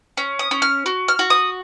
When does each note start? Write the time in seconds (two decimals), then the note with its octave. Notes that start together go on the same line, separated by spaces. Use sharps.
0.17 C#4
0.39 D#6
0.51 C#4
0.62 F6
0.86 F#4
1.08 F6
1.19 F#4
1.30 D#6